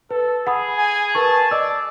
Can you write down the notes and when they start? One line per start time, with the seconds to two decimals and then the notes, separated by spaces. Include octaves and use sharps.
0.11 A4 B4
0.47 G#4 F#5 B5 D#6
0.78 G#5
1.15 A#4 B4 A5 C#6
1.51 D5 D#5 E6